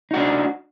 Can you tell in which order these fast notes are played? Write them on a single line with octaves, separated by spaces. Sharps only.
D#4 F#4 D4